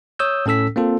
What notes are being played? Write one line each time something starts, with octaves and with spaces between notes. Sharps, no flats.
C#5 D#6 E6 G6
A2 C#4 A4 E6 B6
A#3 C4 F4 A4